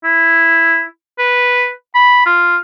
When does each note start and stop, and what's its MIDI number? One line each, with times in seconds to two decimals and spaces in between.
0.04 0.84 64
1.19 1.71 71
1.95 2.22 83
2.26 2.57 65